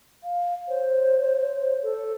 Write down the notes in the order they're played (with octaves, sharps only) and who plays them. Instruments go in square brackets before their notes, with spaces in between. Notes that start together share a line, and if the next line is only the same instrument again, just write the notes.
[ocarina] F5
[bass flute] C5 [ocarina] C#5
[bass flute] A4